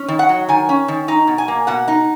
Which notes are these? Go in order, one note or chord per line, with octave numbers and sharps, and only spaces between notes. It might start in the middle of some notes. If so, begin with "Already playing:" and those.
Already playing: C#4
D#3
F#5
F#3
D#3 G#5
C#4
D#3
D#4 A#5
B2
G#5
A#3
B2 F#5
D#4